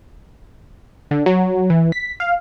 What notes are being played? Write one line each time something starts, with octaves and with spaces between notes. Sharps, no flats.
D3
F#3
E3
B6
F5